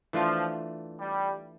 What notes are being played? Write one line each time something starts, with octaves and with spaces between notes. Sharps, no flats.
E3 F3 A3 D4 F4
G3